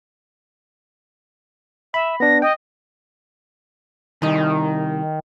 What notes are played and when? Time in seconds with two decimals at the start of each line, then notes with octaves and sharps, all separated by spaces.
1.94 E5 B5
2.20 B3 D4 A#6
2.42 D#5 G5
4.22 C2 D#3 D#4